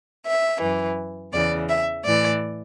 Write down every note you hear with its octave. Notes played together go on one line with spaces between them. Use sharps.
E5
F#2 E3
E2 C#3 E3 D5
E5
A2 E3 D5